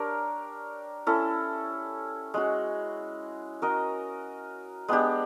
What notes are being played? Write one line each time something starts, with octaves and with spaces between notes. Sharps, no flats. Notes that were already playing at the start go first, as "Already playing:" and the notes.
Already playing: D4 G4 A#4 C#5
C#4 E4 A4
G#3 C#4 F#4
C#4 F#4 A#4 D#5
G#3 B3 D4 G4